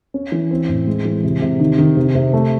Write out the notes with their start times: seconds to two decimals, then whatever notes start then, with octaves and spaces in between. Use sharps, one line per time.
0.14 C#4
0.32 E3
0.51 C4
0.69 A2
0.87 G#3
1.05 E3
1.24 C3
1.42 C3
1.60 D#3
1.79 D#3
1.97 C3
2.15 C3
2.33 A3